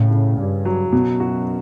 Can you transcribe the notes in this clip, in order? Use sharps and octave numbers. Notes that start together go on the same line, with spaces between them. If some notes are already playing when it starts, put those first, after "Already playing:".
Already playing: A2 C#3
C#3
G2 C#4
F#3
F#2 B2
F#4